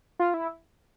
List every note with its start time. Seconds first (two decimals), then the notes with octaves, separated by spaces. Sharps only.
0.19 F4
0.34 E4